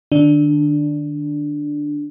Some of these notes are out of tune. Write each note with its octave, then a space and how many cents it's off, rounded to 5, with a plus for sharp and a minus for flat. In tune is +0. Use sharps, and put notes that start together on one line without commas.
D#3 -45 D4 +0